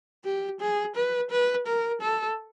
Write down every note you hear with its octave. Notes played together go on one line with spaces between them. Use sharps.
G4
G#4
B4
B4
A#4
A4